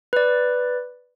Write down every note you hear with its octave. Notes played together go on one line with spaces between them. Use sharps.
B4 D5